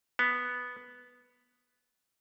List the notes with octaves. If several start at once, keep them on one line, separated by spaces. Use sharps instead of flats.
B3